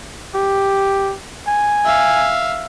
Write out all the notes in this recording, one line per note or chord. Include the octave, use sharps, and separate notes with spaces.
G4
G#5
E5 F5